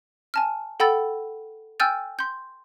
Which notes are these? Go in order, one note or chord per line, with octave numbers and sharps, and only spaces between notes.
G#5 A5 F6
A4 F#5 G5 B5 E6 A6
G5 G#5 E6 F6 G6 A6
C6 G6